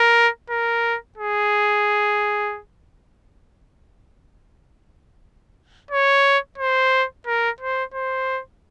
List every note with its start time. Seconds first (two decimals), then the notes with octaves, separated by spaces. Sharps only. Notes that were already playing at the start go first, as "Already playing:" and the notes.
Already playing: A#4
0.50 A#4
1.18 G#4
5.91 C#5
6.58 C5
7.26 A#4
7.61 C5
7.94 C5